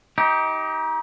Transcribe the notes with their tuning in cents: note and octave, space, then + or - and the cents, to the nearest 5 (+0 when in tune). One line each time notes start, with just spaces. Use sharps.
D#4 +25 G4 -10